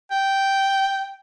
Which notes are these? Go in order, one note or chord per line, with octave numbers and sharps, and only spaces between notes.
G5